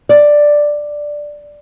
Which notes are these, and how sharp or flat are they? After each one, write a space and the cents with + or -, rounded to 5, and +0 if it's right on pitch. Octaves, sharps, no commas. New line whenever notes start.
D5 +5